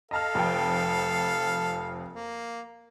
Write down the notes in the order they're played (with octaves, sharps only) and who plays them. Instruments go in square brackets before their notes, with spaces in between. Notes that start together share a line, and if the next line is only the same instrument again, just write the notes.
[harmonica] A4 F5 [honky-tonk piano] D#5 A5 F6
[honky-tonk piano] F1 F2 G5
[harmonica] A#3